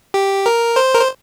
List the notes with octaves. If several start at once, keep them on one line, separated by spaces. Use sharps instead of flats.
G4
A#4
C5
A#4
C5